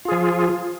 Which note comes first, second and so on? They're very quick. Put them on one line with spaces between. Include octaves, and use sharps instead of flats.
F4 G#4 F3